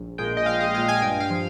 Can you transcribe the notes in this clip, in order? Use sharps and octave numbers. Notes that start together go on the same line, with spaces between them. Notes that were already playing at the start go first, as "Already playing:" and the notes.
Already playing: A#1
A#2 G#3 G5
D#5
A#1 F5
D#5
A#2 G#3 F5
G#5
G2 G5
F5
F3